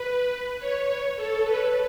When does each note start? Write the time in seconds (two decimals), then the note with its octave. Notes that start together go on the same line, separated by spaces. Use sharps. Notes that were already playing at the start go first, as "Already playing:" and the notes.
Already playing: B4
0.59 C#5
1.16 A4
1.44 B4